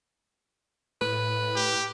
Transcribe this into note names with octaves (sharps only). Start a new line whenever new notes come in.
A2 B4
G4